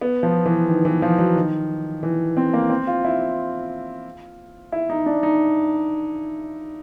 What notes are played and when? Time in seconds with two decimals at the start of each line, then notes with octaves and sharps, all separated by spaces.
0.01 B3
0.23 F3
0.46 E3
0.68 D#3
0.85 E3
1.02 F3
1.18 F#3
1.35 D#3
2.03 E3
2.37 C4
2.53 A#3
2.70 C4
2.87 F4
3.05 E4
3.20 F4
4.72 E4
4.90 D#4
5.06 D4
5.23 D#4